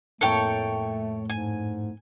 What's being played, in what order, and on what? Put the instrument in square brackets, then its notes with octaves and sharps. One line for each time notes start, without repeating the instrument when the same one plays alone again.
[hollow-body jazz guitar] F2 A2 A#3 [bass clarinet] A3 [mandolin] A4 C#5 G5
[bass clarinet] G#2 [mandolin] G#5